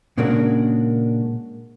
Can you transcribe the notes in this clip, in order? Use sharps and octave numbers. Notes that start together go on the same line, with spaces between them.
A#2 C#3 G#3 A#3 D4 F#4